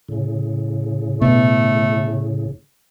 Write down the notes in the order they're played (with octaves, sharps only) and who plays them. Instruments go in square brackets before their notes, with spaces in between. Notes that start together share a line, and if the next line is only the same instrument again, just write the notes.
[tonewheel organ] A2 C#3
[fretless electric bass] B2 [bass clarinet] A3